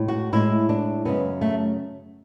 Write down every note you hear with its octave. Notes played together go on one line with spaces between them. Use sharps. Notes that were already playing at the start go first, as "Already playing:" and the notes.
Already playing: A2 G#3
F#4
A2 G#3 E4
D4
F#2 C#3 G#3 B3
A3